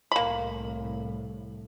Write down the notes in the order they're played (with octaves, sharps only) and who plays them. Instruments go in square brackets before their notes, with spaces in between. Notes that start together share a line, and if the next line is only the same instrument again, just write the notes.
[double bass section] C2 A2 [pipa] A#3 B5